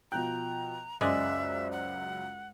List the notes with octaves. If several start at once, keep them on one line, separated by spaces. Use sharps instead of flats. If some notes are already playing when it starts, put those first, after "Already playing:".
B2 F3 G5 A#5 F#6
C#2 F#2 G#3 C5 D5 E5 F#6
F#5